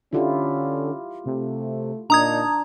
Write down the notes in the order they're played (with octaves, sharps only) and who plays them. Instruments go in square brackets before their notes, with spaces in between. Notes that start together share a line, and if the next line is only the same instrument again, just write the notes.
[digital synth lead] D3 [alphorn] C#4 [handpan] E4 F4 G4
[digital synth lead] C3 [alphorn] A3
[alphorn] A#2 [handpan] D4 [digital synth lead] D#4 [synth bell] A#5 D#6 G#6